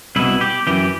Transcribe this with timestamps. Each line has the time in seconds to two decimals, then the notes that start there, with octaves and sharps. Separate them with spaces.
0.16 C2 B2 E4
0.41 G4
0.67 F#2 E3 G4